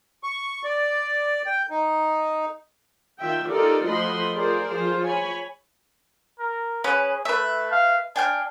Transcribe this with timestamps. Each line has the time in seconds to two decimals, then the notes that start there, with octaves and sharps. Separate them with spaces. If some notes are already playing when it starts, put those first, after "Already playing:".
0.23 C#6
0.64 D5
1.46 G5
1.70 D#4
3.19 D#3 F4 E5 G5
3.49 D#4 F4 G4 A4 A#4 D5
3.86 F3 A3 F#4 D#5 B5 C6
4.35 F4 G#4 A#4 C5 D5
4.69 F3 F4 G#4 C5
5.04 C#5 G#5 B5
6.39 A#4
6.84 C#4 G#4 B4
7.25 A3 B4 E5
7.72 F5
8.16 D4 G5 G#5 F6